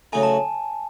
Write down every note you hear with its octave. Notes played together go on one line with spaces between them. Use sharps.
C#3 F#3 A3 D#4 G#5
A5